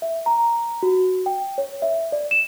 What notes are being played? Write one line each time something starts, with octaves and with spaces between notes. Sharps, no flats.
E5
A#5
F#4
G5
C#5
E5
D5
E7